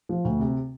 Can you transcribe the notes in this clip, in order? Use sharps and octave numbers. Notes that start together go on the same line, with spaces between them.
F3
D2
C3